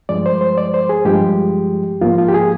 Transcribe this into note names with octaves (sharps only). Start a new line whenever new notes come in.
G2 F3 G#3 D5
C5
C5
D5
C5
G#4
G2 F3 G#3 G4
G#2 F3 A#3 F4
F4
G4
G#4